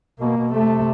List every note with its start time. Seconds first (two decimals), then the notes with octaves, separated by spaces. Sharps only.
0.20 B2 A#3
0.37 B2
0.53 C3 A3